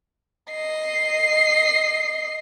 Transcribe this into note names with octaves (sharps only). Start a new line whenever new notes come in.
D#5 C7